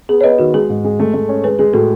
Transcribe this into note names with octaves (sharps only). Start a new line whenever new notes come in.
B3 G#4
C#5
B3 B4 D#5
D#3 F#4
G#3 G#4
G#2
G#3
A3
A3
C#4
G#3 G#4 B4
G#3 G#4
A2 F#4 A4